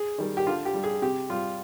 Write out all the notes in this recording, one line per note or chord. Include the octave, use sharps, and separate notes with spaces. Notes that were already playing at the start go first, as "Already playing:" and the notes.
Already playing: G#4
D#3 G3
G4
D3 F4
G4
G3
G#4
C3 G4
G3 F4